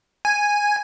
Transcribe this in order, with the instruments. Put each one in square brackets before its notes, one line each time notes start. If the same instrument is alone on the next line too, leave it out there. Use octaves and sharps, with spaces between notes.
[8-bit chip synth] G#5